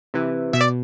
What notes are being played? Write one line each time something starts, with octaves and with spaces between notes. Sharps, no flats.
C3 E3
B2 E5
D5